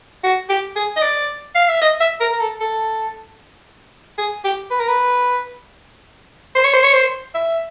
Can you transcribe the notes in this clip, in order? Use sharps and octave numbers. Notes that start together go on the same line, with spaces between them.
F#4
G4
G#4
D#5
D5
F5
E5
D#5
E5
A#4
A#4
A4
A4
G#4
G4
B4
A#4
B4
C5
C#5
C5
C#5
C5
E5